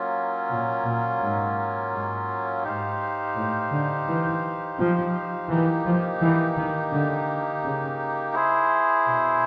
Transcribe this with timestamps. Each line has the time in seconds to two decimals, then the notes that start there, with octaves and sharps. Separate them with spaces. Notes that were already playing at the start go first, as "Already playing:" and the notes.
Already playing: F#3 A#3 C#4 F4
0.49 A#2
0.85 A#2
1.21 G#2
1.92 G#2
2.64 G#2 D#4 G4 C5 F5
3.35 A2
3.71 D3
4.07 E3
4.79 F3
5.49 E3 A#3 D#4 G4
5.85 F3
6.20 E3
6.56 D#3
6.92 D3
7.64 C#3
8.34 E4 G#4 C5
9.06 B2